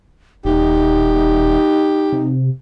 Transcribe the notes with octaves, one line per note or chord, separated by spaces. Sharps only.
D#1 D#4 G4
C3